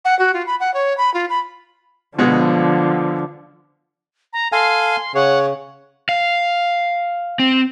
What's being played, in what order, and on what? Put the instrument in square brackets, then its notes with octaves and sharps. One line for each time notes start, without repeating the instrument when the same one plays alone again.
[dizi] F#5
F#4
F4
B5
F#5
C#5
B5
F4
B5
[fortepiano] B2 G#3 B3 [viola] D3 F3
[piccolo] A#5
[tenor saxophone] A4 [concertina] F5 G#5 [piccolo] C6
[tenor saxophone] C#3 [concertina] C#5 [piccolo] F#5
[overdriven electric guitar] F5
C4